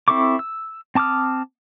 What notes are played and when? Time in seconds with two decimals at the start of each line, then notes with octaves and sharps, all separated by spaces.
0.08 C4 E4 A4 C#6 D6
0.39 E6
0.95 C4 A5 D6 D#6 F6